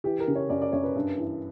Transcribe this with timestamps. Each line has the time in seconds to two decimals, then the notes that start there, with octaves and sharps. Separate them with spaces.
0.04 E3 G4
0.20 A#4
0.28 C#3
0.35 C#5
0.49 F#2 D5
0.62 D5
0.72 F#2 C#5
0.84 B4
0.96 G2
1.18 E3